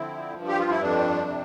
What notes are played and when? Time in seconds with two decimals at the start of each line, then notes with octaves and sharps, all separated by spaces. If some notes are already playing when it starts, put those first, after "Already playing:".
Already playing: D3 F3 C4 E4
0.36 G2
0.48 G4
0.60 F4
0.70 E4
0.81 F2 D4
1.26 C3